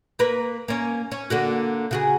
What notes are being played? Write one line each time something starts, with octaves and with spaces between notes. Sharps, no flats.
A#3 A#4 B4
A#3 C#4
C#4
D3 A#3 F#4
C#3 F#4 G#4